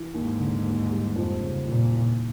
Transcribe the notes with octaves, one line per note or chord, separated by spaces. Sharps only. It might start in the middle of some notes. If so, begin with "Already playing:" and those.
Already playing: E3
D#2 G#2
D3
D#2
G3
F2
C#3
F2 A#2
E3